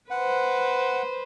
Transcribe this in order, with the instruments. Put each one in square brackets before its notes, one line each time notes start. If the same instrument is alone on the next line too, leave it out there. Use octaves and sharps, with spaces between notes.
[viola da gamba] B4 C5 [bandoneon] F#5